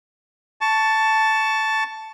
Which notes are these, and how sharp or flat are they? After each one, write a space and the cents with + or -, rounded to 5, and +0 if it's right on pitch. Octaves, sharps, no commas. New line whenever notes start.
A5 +0 C#6 +15